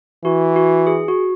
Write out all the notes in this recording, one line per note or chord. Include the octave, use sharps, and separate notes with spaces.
E3 F#4
F#4
G#4
F#4